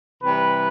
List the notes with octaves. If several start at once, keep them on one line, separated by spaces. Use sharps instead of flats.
C3 E3 G3 B4